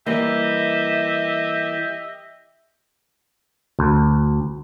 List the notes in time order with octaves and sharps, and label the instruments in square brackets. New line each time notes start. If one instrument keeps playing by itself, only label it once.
[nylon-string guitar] E3 G3 A#3 [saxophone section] G4 D#5 E5
[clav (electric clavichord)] D2